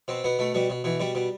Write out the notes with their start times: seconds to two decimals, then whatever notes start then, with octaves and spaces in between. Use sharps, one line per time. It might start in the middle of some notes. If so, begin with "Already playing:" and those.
0.08 B2 C4
0.24 B2 B3
0.39 B2 A3
0.54 B2 G3
0.70 B2
0.84 B2 E3
1.00 B2 G3
1.15 B2